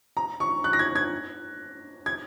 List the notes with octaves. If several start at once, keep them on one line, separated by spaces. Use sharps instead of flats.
A#5
C#6
F#6
A#6
G#6
G#6
G#6